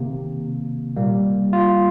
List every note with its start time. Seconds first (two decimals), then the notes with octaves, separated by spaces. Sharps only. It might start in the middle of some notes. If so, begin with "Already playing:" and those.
Already playing: C3 D#3 A#3
0.96 A#2 G3 A#3
1.53 F4